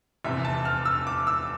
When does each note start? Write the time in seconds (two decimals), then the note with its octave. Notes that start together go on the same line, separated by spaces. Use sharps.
0.24 F1 E2 C3 E5
0.45 A5
0.65 F6
0.85 E6
1.07 D6
1.27 E6